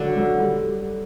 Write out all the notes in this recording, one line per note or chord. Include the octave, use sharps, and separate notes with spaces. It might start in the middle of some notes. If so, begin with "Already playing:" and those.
Already playing: D3 F#3
F#3
G3